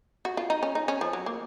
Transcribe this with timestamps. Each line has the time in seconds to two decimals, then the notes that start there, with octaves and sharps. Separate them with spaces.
0.25 F#4
0.37 F4
0.50 D#4
0.63 C#4
0.75 D#4
0.88 C#4
1.01 F3
1.13 F#3
1.26 A#3